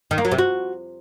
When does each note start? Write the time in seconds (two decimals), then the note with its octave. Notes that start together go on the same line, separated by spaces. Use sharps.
0.11 D#3
0.18 A#3
0.25 F#3
0.32 C3
0.38 F#4